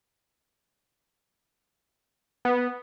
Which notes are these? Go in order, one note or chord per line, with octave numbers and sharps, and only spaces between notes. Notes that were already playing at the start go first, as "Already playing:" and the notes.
B3